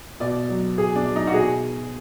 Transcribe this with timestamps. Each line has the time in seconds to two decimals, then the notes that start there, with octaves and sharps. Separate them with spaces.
0.20 B2 D5
0.49 F#3
0.77 B2 G#4
0.96 D4
1.06 F#3
1.16 D#4
1.27 F#4
1.34 B2 G#4